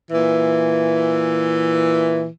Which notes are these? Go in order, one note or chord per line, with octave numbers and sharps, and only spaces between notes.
A#2 E3